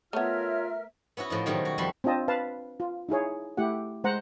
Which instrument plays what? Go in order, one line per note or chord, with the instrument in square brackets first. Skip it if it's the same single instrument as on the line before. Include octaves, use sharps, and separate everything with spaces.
[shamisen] A3 B3 [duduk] F4 [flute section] A#4 E5 F6 [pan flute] C#5
[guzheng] B3 C#4 E4 F#4
A2 F3 D#4
B2 D#3 F#3 G3 A3
F#4
F2 G3 A4 C5 B5 C6
[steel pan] C4 D4 F4 D#5 A5
B4 F5 A5
F4
D#4 E4 G#4 C#5
A3 E4 G4 F#5
G#3 C5 F#5 A#5